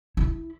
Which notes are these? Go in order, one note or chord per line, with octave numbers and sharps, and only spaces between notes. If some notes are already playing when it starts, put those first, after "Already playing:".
E4